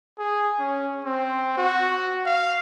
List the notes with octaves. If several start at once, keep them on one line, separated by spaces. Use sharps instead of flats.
G#4
C#4
C4
F#4
F5